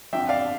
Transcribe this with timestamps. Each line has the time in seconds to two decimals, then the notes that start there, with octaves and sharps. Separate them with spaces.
0.13 F2 D3 F3 E5 G5
0.29 D5 F5